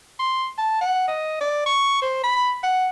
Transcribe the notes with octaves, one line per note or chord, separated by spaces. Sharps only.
C6
A5
F#5
D#5
D5
C#6
C5
B5
F#5